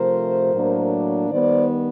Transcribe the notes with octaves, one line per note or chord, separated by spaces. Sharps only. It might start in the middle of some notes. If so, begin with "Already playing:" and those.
Already playing: C3 F3 A3 A#4 C5
A2 F#3 A#3 D4
D#3 G3 B3 C5 D5